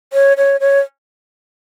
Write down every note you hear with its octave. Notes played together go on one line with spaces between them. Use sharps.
C#5
C#5
C#5